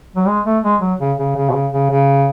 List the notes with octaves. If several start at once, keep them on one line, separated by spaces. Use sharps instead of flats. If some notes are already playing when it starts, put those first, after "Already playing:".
F#3
G#3
A3
G#3
F#3
C#3
C#3
C#3
B2
C#3
C#3
C#3